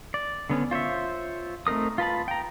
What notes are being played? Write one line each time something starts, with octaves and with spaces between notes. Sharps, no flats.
D5
D3 B3 C#4
F4 C5 C#5 E5
A3 C4 D#4 A#4 D#6
F4 B4 A5 B5
G5 A#5